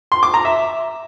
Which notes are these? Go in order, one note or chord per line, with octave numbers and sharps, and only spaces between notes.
C6
D6
A#5
E5